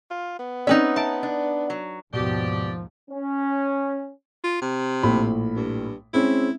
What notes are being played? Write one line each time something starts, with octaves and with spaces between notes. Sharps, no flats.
F4
B3
C4 C#4 D#4 B4 D5 E5
E5 A5 A#5 D7
D4
F#3
D#2 G#2 B2 F3 G4 D5
C#4
F4
C3
A#1 A2 B5
G2
G#3 C4 C#4 E4